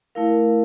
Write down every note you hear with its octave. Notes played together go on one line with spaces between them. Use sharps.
A3 E4 A#4 F5